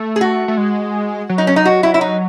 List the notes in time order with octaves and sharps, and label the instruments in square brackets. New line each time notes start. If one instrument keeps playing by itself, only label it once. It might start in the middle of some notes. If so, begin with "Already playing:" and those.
Already playing: [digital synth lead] A3
[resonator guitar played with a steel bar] G#4
F#4
[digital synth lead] A3
G#3
F#3
[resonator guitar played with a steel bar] D#4
C#4
D#4
F#4
E4
E4
D#4